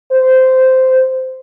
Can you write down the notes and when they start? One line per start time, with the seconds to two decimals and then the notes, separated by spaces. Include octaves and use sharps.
0.12 C5